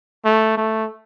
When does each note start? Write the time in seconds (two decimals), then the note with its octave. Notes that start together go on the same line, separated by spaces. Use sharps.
0.25 A3
0.57 A3